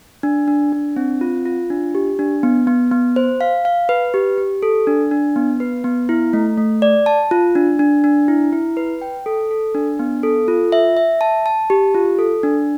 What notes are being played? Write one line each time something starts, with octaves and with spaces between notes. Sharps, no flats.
D4
D4
D4
C4
F4
F4
D4
G4
D4
B3
B3
B3
C5
F5
F5
B4
G4
G4
A4
D4
D4
B3
B4
B3
E4
A3
A3
D5
A5
F4
D4
D4
D4
E4
E4
B4
G5
A4
A4
D4
B3
A4
F4
E5
E5
A5
A5
G4
F4
A4
D4